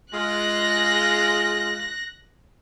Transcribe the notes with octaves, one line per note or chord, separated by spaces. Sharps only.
G#3 F4 F#6 A#6